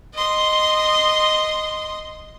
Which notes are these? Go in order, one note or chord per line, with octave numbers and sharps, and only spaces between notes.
D#5 C6